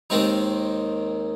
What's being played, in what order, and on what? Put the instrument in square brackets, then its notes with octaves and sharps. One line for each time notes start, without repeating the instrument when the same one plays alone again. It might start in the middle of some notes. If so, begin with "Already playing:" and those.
[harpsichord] D#2 D#3 G#3 C4 D#4